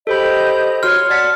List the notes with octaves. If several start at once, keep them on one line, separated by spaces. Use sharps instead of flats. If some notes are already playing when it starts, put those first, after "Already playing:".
G4 A4 C5 D#5 B5 G6
F#4 C#5 C6 F6
D5 F#5 A5 A6 B6